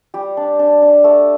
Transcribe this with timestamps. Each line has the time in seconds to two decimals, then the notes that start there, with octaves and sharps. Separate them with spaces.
0.14 G3 G4
0.37 D4
0.59 D4
0.82 D4
1.04 A3